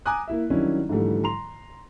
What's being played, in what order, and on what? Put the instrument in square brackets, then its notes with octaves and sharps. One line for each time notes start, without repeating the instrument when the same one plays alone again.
[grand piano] G#5 A#5 D6 D#6 F#6
A#3 E4 E5
D#3 F#3 G3 C#4 D4 E4
G#2 D3 E3 F3 G3 A3
A#5 C6 F7